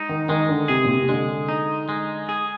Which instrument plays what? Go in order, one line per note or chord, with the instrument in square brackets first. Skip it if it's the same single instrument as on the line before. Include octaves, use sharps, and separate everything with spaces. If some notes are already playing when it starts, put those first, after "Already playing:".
Already playing: [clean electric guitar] G#3 D#4
[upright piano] D#3
[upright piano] D#3 [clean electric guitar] G#3
[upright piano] D3
[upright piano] C3 [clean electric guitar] G#4
[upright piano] A#2
C3
C3
[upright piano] D3 [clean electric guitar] G#3
[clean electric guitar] D#4
G#3
G#4